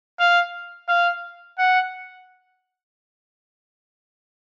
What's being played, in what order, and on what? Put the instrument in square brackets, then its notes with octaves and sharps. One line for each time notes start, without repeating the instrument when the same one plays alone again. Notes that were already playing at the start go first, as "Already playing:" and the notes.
[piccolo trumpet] F5
F5
F#5